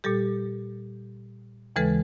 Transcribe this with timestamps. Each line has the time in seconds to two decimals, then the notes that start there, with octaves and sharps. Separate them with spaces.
0.04 A#2 G3 G4 A4
1.76 D#2 C#3 E3 G#3 A4 B4